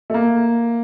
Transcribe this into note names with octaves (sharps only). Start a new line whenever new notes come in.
A3
A#3